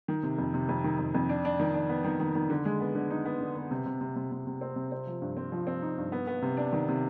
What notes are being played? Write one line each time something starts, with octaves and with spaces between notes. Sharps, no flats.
D#3
C3
F2
C3
F2
D#3
F2
F2
D4
D4
D#3
D4
B3
D#3
D#3
D#3
D3
G#3
B3
D3
D#4
B3
D3
B3
C3
C3
C3
C3
C3
C3
C4
C3
C4
F3
G2
C4
F3
C4
D#4
G2
B3
B3
C3
D4
D#3
C3